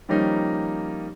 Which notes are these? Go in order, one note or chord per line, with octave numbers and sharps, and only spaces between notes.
D#3 F3 G3 A#3 C#4 D#4